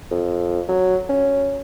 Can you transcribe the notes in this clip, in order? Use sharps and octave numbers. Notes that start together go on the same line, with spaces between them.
F2
F#3
C#4